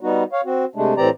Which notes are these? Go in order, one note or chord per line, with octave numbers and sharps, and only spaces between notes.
G3 B3 D#4 F#4
C#5 F5
C4 F#4
C3 G#3 A3 D4
A2 E3 C4 G4 D5 A#5